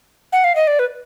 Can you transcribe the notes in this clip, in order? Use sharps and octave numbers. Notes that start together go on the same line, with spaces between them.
F#5
F5
D#5
D5
B4